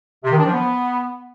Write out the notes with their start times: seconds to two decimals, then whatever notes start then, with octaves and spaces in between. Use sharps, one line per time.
0.24 C3
0.31 D#3
0.38 D4
0.46 F3
0.53 B3